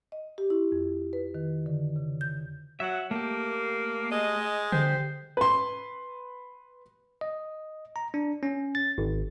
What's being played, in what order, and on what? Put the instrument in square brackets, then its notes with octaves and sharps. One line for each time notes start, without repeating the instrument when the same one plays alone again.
[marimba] D#5
G4
E4
F2
B4
D#3
D3
C#3
G6
[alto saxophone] F#3 [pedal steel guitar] E5 F#5
[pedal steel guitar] A3 G4 [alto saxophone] A#3
[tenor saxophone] G#3 [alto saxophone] D#5
[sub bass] D3 [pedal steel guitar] G4 [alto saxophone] C5
[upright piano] B4 C6
[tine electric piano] D#5
A#5
D4
C#4
A6
G#1